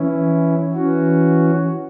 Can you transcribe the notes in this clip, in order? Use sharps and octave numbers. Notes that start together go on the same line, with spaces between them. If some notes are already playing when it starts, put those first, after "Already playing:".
Already playing: E3 C#4 E4
E3 C#4 F#4